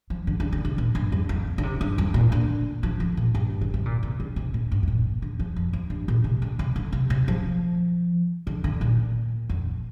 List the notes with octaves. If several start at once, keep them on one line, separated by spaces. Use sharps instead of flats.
F3
D3
D3
D3
C3
A#2
G2
F2
F2
D3
C3
G2
F2
A#2
D3
F3
D3
A#2
G2
D3
C3
A#2
C3
D3
C3
A#2
G2
G2
A#2
D3
F3
F2
F2
G2
A#2
C3
D3
C3
D3
C3
C3
F3
D3
D3
A#2
F2